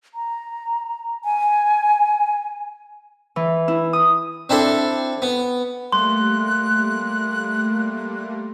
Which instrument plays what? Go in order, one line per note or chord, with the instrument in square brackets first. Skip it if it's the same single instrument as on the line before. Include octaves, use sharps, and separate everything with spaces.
[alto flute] A#5
G#5
[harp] E3
E4
D#6
[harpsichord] C4 D4 E4 A4
B3
[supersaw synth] G3 A3 A#3 [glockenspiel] C6 [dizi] F#6